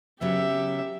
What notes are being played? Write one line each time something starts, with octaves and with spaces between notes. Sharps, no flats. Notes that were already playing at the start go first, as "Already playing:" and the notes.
C#3 F#3 B3 G4 E5